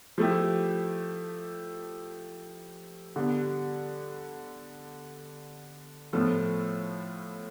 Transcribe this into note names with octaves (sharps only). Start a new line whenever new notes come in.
F3 A3 E4 G4
D3 G3 B3
A2 F3 B3 F4 A4